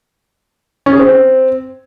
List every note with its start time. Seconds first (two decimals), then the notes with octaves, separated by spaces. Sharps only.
0.86 C#4
0.93 G#4
0.99 C4